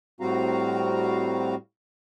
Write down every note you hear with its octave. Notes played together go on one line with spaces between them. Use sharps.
A2 G3 C4 F#4 F5 A#5